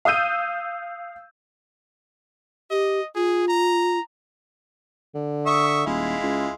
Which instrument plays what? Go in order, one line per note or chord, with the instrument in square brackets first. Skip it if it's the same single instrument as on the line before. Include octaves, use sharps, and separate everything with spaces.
[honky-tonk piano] F5 D#6 E6 G6 D#7
[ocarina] G4 [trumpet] D#5
[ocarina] F4 [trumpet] G#4
[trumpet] A#5
[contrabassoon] D3
[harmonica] E5 C#6 D#6
[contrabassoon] D#1 [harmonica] G#3 E4 F4
[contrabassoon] C#2